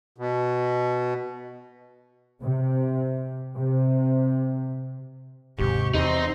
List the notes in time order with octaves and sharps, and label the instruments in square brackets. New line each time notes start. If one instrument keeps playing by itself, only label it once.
[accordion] B2
[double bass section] C3
C3
[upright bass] D#2 C3 [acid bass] G#2 [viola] G4 C#6
[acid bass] E2 [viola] C4 C6 [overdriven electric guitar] D#4